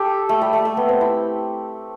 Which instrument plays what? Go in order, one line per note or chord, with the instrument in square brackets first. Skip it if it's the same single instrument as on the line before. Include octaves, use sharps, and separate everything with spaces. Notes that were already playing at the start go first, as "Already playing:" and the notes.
Already playing: [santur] G4 A4
A3
G3
A3
A3
B3
C4
E4